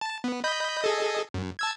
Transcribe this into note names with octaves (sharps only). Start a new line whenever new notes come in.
A5
B3
D#5 B5 G6
G#4 A4 D#5
F#2
A5 E6 G#6